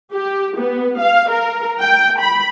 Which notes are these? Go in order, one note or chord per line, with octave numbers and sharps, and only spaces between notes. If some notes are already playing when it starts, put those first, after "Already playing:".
G4
B3
F5
A#4
G5
B5